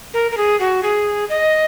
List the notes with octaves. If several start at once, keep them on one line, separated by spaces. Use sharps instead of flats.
A#4
A#4
G#4
F#4
G#4
D#5